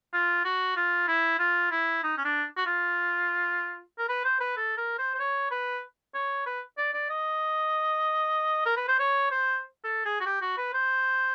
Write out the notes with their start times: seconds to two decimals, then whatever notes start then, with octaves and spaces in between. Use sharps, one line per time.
0.13 F4
0.44 F#4
0.77 F4
1.08 E4
1.39 F4
1.71 E4
2.03 D#4
2.18 C#4
2.24 D4
2.57 F#4
2.66 F4
3.98 A#4
4.09 B4
4.24 C5
4.40 B4
4.57 A4
4.77 A#4
4.98 C5
5.14 C5
5.20 C#5
5.51 B4
6.15 C#5
6.46 B4
6.78 D5
6.93 D5
7.10 D#5
8.65 A#4
8.77 B4
8.88 C5
8.99 C#5
9.31 C5
9.84 A4
10.05 G#4
10.21 F#4
10.26 G4
10.42 F#4
10.57 B4
10.74 C5